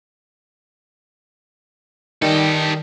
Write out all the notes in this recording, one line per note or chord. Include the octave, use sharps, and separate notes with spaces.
D#3 G3 D#4 G4 A4